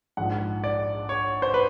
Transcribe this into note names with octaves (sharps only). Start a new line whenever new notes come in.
A#1 G#2 F3 F#5
D5
C#5
C5
B4